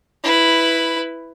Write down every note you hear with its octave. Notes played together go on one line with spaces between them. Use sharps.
E4 B4